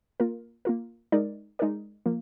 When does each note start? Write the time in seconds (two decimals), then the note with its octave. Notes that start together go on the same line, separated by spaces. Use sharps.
0.20 A#3 F4 A#4
0.65 A#3 F4 A#4
1.12 G#3 D#4 A#4 D5
1.59 G#3 D#4 A#4 D5
2.06 F3 A#3